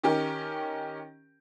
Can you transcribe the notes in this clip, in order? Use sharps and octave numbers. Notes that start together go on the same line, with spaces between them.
D#3 C#4 G4 A#4